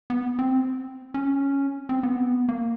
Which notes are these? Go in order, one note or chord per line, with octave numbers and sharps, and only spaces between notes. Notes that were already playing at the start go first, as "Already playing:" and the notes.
B3
C4
C#4
C4
B3
A#3